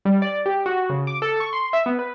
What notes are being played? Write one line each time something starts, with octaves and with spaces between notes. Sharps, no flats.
G3
D5
G4
F#4
C#3
D6
A4
C#6
C6
E5
B3
B4